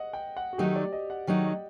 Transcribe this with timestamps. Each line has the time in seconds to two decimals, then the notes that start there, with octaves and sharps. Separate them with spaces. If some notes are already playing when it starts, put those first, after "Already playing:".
Already playing: D#5 F#5
0.13 G5
0.37 F#5
0.53 F#4
0.58 D#3 F#3 A3 D#4 G4
0.76 D5
0.93 D#5
1.10 F#5
1.27 D#3 F#3 A3 D#4 G5
1.44 D#5